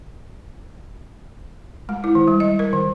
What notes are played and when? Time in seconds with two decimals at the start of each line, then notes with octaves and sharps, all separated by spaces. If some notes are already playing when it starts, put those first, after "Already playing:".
1.89 G#3
2.04 E4
2.15 D#3
2.28 G3
2.40 D#5
2.59 A#4
2.73 D#3